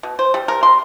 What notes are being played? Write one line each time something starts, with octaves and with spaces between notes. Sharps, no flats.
B2
C5
G3
A#4
C6